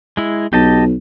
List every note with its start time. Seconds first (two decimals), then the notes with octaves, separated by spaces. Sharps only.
0.17 G#3 E4
0.53 B1 G4 D#5 A5